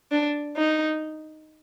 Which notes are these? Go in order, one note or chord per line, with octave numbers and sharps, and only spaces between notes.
D4
D#4